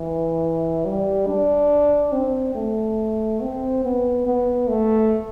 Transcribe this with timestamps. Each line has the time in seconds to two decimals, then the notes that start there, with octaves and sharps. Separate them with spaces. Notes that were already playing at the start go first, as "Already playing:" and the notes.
Already playing: E3
0.85 G3
1.27 D4
2.12 C4
2.55 A3
3.41 C4
3.83 B3
4.26 B3
4.69 A3